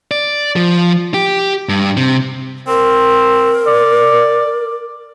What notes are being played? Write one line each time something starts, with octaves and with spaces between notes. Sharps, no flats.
D5
F3
G4
G2
C3
C4 A#4
D5